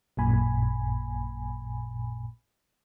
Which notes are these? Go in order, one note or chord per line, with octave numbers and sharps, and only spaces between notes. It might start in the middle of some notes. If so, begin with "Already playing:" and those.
A1 F#2 A#2 G#5 B5